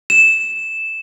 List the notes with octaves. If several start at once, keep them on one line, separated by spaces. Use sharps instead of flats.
E7